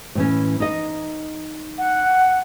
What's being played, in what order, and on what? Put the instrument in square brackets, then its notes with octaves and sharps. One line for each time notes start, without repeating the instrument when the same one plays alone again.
[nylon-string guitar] A2 E3 C#4
D#4 D#5
[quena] F#5